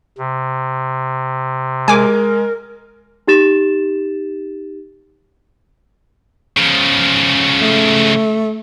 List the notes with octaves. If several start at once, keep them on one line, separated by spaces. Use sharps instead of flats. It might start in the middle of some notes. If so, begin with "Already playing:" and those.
C3
G#3 A#4 G#5 D6
D#4 G4 A6 E7
C#3 F3
A3